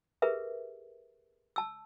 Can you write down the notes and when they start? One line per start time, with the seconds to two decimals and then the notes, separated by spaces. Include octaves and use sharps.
0.22 G4 G#4 A#4 B4 E5
1.56 A5 E6